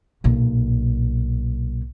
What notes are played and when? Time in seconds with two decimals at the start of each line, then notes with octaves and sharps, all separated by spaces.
0.24 B1 A#2